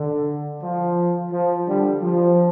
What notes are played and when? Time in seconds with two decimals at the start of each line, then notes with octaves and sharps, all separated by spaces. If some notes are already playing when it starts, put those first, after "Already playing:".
Already playing: D3
0.62 F3
1.32 F3
1.67 D3 G3
2.02 F3